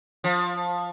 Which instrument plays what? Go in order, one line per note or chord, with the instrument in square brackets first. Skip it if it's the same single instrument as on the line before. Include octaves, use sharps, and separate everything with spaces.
[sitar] F3